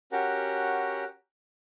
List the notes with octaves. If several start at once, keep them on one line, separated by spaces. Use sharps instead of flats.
C#4 F#4 G4 A#4 F#5